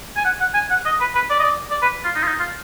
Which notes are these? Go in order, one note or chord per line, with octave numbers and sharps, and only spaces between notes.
G#5
F#5
F#5
G#5
F#5
D#5
B4
B4
D5
D#5
D5
D5
B4
F4
D#4
F4
D#4
F4